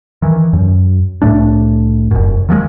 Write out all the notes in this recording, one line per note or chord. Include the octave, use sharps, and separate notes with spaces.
D#3 E3
F#2
C2 A2 A3 D4
F1 F#2
D#3 F3 F#3 G#3